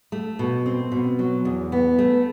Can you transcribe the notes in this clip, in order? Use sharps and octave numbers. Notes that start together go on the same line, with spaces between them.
A3
B2
C4
B2
F#3
E2
B3
A3